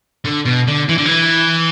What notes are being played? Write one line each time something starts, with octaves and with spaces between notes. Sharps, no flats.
D3
B2
D3
E3
D3
E3